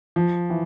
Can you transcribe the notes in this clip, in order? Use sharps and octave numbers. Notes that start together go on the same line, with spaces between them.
F3
E3